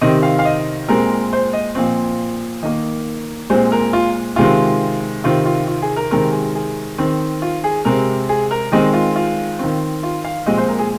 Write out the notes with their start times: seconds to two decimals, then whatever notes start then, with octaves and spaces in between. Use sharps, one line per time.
0.01 C3 D#3 C4 D#5
0.23 F5
0.39 F5
0.45 D#5
0.88 A#2 G#3 C4 A#4
1.33 C5
1.53 D#5
1.75 A#2 F3 C4
2.63 D#3 A#3 D#5
3.50 A#2 G#3 C4 C5
3.72 A#4
3.93 F4
4.36 C3 D#3 G#3 C4 F4
5.24 C3 D#3 C4 F4
5.45 F4
5.67 F4
5.82 G#4
5.96 A#4
6.11 C3 D#3 G#3 C4 A#4
6.32 G#4
6.55 G#4
6.98 D#3 C4
7.42 F4
7.64 G#4
7.85 C3 G#3 C4 A#4
8.29 G#4
8.51 A#4
8.72 D#3 G#3 C4 D#5
8.93 F4
9.16 F4
9.59 D#3 C4
10.03 F4
10.25 F5
10.46 A#2 F3 G#3 C4 D#5
10.58 C5
10.69 A#4
10.79 G#4